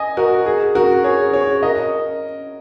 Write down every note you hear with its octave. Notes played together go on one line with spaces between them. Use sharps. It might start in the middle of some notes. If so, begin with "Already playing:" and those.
Already playing: D#5 G#5
F#4 A#4
G#4
F#4 A#4
G#4 C#5
G#4 C#5
A#4 D#5